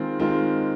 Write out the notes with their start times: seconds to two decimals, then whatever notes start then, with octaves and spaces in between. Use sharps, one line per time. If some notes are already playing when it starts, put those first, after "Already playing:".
Already playing: D#3 G#3 C4 F4
0.19 D#3 G#3 C4 F4